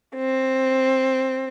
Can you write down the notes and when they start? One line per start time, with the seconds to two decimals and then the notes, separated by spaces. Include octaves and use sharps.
0.16 C4